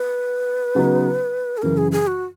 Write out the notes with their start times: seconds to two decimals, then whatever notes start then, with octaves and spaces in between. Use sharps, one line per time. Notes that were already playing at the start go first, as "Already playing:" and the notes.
Already playing: B4
0.75 C#3 F#3 B3 D#4
1.57 G#4
1.62 F#2 C#3 E3 A#4
1.78 G#4
1.92 G#4
2.07 F#4